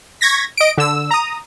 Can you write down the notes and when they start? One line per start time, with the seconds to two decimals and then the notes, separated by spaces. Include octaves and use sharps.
0.21 C#6 G#6 A#6 B6
0.57 D#5 D7
0.77 D3 E6
1.11 A#5 D#6